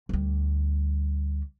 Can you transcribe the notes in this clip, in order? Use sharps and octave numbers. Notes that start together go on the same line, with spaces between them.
D2 G3